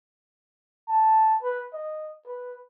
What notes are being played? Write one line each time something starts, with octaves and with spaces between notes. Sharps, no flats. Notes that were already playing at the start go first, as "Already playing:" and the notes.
A5
B4
D#5
B4